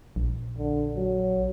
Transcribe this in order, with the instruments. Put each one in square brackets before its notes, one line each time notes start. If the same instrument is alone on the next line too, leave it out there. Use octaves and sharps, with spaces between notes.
[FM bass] A#1
[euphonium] D3
F#3